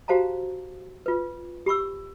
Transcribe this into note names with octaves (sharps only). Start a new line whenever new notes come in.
F#4 G4 C5 F5 A5 A#5
F4 B4
G4 B5 C#6 E6